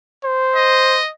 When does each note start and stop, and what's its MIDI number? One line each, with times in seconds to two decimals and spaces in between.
0.25 0.99 72
0.56 1.10 75